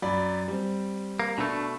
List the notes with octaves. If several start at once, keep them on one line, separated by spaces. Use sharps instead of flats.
F#2 D5 B5
G3 C4
A#3
B2 A3 D4